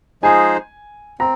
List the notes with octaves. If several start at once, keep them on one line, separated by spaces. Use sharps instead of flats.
F3 G#3 D#4 G#4 C5 G#5
C4 A#5